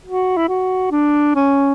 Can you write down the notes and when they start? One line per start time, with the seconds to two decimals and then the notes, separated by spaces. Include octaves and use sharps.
0.05 F#4
0.37 E4
0.48 F#4
0.91 D4
1.35 C#4